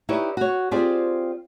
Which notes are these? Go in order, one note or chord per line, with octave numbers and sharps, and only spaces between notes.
D#4 E4 G4 B4 C#5 D5
F#4 C#5
C4 F4 G4 G#4 C5 D5